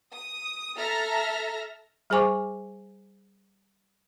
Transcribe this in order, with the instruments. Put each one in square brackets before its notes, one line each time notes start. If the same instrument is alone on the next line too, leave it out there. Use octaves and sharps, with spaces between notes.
[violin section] D#6
A4 E5 A5 A#5 F6 A#6
[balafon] G3 G#4 C5 G#5 C#6 D6